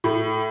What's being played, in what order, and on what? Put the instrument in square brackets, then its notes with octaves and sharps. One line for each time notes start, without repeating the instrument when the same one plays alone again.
[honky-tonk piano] A2